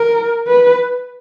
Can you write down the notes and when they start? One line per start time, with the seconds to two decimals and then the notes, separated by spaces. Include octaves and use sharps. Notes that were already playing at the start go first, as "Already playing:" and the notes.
Already playing: A#4
0.48 B4